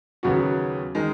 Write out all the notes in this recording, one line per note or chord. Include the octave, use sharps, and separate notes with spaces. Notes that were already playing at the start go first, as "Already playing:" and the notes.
D#2 C#3 F#3 B3 F#4
D#3 G#3